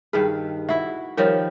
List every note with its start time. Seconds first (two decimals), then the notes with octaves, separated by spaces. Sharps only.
0.13 G2 D#3 G#4 B4
0.69 E4 F#4 E5
1.17 D#3 F3 G3 A#4 C#5